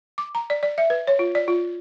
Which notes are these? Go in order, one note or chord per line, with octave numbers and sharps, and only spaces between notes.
D6
A#5
D5
D5
E5
B4
C#5
F4
D5
F4